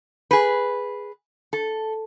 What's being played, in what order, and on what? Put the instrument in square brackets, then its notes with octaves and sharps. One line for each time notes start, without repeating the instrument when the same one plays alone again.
[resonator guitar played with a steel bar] G#4 B4
A4